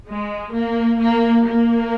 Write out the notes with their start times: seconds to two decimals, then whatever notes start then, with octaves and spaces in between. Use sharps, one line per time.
0.08 G#3
0.55 A#3
1.01 A#3
1.48 A#3